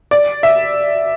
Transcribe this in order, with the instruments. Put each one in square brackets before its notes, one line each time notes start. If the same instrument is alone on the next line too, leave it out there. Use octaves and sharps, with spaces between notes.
[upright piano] D5
E5